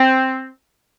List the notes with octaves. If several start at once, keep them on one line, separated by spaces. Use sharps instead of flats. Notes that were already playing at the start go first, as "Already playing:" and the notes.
Already playing: C4